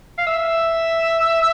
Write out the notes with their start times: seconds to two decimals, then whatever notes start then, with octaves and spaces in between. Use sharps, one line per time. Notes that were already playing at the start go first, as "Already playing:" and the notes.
0.18 F5
0.27 E5